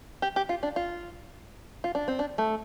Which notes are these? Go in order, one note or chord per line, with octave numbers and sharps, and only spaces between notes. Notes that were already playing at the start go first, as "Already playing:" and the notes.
G4
G4
F4
D4
F4
F4
D4
C4
D4
A3